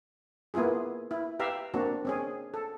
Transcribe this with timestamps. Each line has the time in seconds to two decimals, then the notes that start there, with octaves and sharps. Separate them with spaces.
0.54 A#3 B3 E4 F4 G#4
1.11 E4
1.39 G4 B4 E5 F5 A#5
1.74 A#3 C4 D4 F#4
2.05 C4 C#4 G#4
2.54 A4